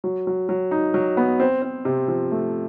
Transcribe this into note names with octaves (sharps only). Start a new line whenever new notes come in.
F#3
F#3
F#3
D#4
F#3
B3
C4
C4
C3
F3
A3